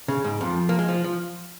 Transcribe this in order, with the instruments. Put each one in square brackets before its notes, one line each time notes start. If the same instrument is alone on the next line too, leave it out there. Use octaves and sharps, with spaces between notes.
[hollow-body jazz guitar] C#3
G#2
[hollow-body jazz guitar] F2 [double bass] F3
[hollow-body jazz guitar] A#3
G#3
F3
F3